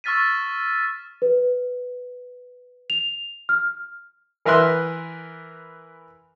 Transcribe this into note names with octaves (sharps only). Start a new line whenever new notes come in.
C#6 E6 F6 A6 B6 D#7
B4
F7
F6
E3 A#4 B4 E5 C6 F#6